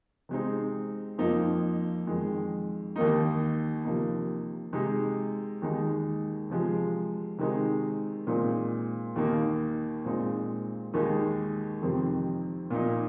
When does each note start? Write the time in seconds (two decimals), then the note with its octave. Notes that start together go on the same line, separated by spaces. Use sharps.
0.29 C3 G#3 C4 D#4
1.18 F2 F3 A#3 D#4
2.07 F2 D#3 G#3
2.96 D#2 D#3 A#3 D#4
3.84 C3 F3 A#3 D#4
4.73 C3 G#3 D#4
5.62 D#2 D#3 G#3 D#4
6.50 C3 F3 G#3
7.38 C3 D#3 G#3 C4 D#4
8.27 A#2 G#3 C4 D#4
9.15 D#2 D#3 A#3 D#4
10.05 A#2 G#3 C4 D#4
10.94 D#2 D#3 G#3 D#4
11.82 F2 C3 D#3 C4
12.70 A#2 A#3 D#4